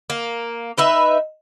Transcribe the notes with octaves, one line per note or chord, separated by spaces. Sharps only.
A#3
D#4 B4 E5